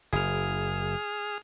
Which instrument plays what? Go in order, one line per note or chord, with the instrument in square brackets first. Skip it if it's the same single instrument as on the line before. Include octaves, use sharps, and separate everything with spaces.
[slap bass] F#1 [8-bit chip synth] G#4 F6